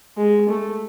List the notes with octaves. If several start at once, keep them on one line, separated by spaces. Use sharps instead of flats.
G#3
A3